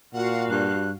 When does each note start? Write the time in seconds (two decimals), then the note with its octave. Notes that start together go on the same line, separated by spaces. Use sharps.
0.14 A#2 F#4 F5 F#5
0.50 G2 F#6